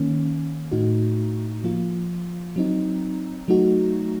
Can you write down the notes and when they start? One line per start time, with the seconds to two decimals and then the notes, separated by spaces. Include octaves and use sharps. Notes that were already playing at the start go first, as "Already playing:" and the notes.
Already playing: D#3 A#3 C#4
0.71 A2 A3 D#4 F#4
1.64 F3 A#3 F4
2.56 F#3 C4 D#4
3.48 F#3 A3 D#4 F#4